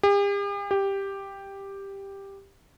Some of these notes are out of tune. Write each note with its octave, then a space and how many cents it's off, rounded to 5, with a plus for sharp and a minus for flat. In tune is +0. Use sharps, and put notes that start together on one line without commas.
G4 +45
G4 +5